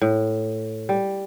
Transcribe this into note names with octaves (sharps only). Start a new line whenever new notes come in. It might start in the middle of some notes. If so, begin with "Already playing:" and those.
A2
G3